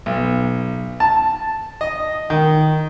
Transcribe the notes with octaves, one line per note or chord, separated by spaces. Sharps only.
B1
A5
D#5
D#3